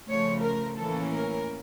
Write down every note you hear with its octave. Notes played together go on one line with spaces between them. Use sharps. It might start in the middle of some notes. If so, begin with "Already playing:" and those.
C#3 F3 A3 C#5
A#4
A2 E3 A#3 C#4 A4
A#4